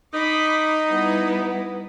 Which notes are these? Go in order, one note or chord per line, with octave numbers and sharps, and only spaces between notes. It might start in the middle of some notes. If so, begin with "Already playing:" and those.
D#4 B5 D6
G3 B3 E4